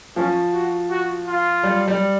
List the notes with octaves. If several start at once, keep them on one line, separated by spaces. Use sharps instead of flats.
F3 C#4
F#4
F#4
F4
G3
G3